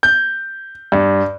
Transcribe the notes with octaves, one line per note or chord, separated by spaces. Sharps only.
G6
G2